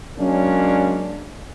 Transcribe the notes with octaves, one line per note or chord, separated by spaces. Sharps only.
F#3 G#3 A#3 C#4 D4